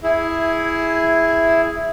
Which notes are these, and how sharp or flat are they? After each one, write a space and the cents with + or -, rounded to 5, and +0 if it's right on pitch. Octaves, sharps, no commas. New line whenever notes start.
E4 +0 G#4 +0